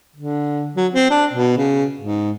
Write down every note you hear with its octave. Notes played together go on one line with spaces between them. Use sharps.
D3
F#3
C4
D4
B2
C#3
G#2